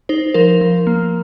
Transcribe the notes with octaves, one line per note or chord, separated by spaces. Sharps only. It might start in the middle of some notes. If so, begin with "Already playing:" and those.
D#4 C5
F3 A#4
F3
A#3